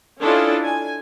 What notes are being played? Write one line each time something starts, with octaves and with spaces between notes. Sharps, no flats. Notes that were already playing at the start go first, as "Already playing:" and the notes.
C#4 D4 E4 F4 A4 D#5
G#5